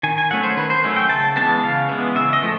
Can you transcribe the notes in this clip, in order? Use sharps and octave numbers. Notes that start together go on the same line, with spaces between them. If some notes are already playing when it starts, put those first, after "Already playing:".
D#3 G#5
G#5
F#3 A3 C#4 F#5
C5
D#3 B4
C5
F#3 A3 C#4
G5
C#3 A5
E3 G#3 B3 A5
C#3 F5
E3 G#3 B3
C#3 E5
D#5
F3 A3